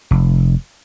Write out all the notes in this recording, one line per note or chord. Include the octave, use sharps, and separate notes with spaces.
F1